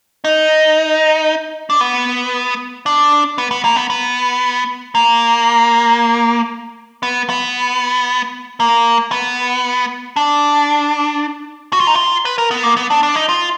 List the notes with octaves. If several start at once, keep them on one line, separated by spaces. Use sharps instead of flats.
D#4
D4
B3
D4
B3
B3
A#3
B3
B3
A#3
B3
B3
A#3
B3
D4
F#4
F4
D#4
F4
B4
A#4
B3
A#3
B3
D4
D4
D#4
F4